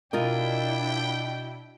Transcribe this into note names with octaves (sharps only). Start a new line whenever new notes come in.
B2 D4 E4 F4 A#4 D#5 G5